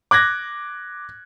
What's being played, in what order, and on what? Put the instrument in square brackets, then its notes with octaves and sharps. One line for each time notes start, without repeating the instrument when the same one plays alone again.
[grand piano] D6 F#6 G#6 A#6